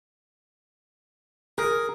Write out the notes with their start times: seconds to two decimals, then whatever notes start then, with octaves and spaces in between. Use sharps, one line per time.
1.58 G#4 A#4